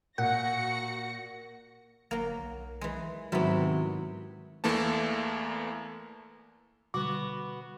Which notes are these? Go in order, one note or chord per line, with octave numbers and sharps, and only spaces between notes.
A#2 F#4 A#4 F#5 A#6 C#7
G1 F#3 A#3
B1
E3 G#3
G#2 C3 D#3 F#3 B3 E4
E2 E3 A3 A#3 A5
B2 D3 G3 B3 F#4 D6